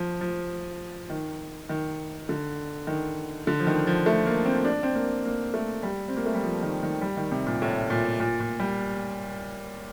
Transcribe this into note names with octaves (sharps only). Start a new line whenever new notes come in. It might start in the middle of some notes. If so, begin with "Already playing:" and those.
Already playing: F3
F3
D#3
D#3
D3
D#3
D3
F3
D#3
F3
A3
A#3
C4
D4
C4
A#3
A#3
A3
G3
C4
A#3
A3
G3
F3
D#3
D#3
G3
D#3
C3
A#2
A2
A#2
A#2
A#2
G3